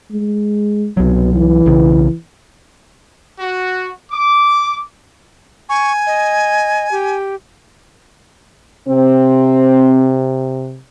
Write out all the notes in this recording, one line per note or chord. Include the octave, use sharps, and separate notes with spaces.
G#3
C2 B2 F#3
E3
B1 C#3
F#4
D6
G#5 C#6
D#5
G4
C3 C4